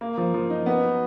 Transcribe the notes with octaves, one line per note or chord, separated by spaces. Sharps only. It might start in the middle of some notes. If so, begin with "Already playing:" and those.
A#3
F3
F3
D#4
B3
F#3